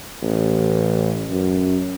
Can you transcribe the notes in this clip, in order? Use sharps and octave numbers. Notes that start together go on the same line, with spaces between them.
A1
F#2